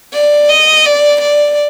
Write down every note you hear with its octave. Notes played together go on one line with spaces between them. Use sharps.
D5
D#5
D5
D5